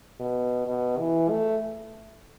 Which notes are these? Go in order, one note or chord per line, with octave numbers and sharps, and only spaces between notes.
B2
B2
E3
A3